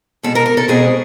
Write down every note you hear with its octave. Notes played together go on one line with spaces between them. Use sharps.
B2 G#3 C4 A4
A#4
A#4
A4
B2 G#3 C4 G#4